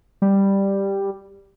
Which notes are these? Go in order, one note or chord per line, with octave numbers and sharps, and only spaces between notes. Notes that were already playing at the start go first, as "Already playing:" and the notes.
G3